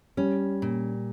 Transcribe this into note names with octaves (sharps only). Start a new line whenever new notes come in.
G3 C#4
A#2